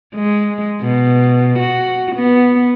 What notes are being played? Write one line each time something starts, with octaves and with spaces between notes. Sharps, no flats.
G#3
B2
F#4
B3